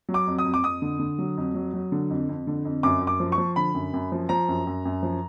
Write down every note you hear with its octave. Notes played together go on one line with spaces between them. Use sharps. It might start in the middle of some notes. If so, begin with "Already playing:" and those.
F#3
D6
F2
D#6
F2
D6
F2 D#6
D3
D3
F#3
F2
F#3
F#3
D3
F2
F2
D3
F2
F#2 D6
F#2
D6
F3
C#6
F3
D3 B5
F#2
F#2
F3
F3 A#5
F#2
F#2
F#2
F3